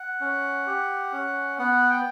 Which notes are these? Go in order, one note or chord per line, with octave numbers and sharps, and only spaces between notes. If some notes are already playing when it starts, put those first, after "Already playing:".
Already playing: F#5
C#4
G4
C#4
B3 F#5
G5